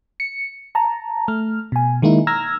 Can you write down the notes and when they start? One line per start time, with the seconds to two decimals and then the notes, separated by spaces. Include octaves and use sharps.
0.20 C#7
0.75 A5 A#5
1.28 A3 F6
1.72 B2 G#5
2.02 D#3 G#3 A#3 D#4 E4
2.27 A#5 E6 F6 G#6 A#6